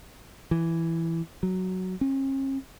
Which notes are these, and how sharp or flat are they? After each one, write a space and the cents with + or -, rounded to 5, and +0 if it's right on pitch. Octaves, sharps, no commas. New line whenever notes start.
E3 +5
F#3 +5
C#4 -45